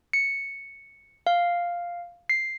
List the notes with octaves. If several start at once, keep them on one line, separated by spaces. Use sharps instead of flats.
C#7
F5
C7